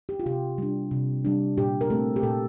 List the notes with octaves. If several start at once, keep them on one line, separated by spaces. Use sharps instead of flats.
G4
F4
C3 G4
G3 D4
C3
G3 D4
A#2 G4
A#4
A3 C4 A4
G4
A#2 A4